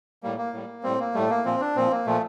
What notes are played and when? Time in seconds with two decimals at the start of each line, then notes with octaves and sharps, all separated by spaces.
0.23 A2 G3 A#3
0.38 A#3
0.53 A2 G3
0.83 A2 G3 C4
1.00 A#3
1.14 A2 G3 A3
1.30 A#3
1.45 A#2 F3 C4
1.60 D4
1.76 A#2 F3 C4
1.90 A#3
2.06 A#2 F3 A3